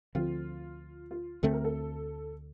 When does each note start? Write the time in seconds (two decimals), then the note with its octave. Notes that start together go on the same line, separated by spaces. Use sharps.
0.15 D2 D3 F3 C4 F4
1.11 F4
1.43 D2 D3 A3 C4 A4
1.53 A#4
1.64 A4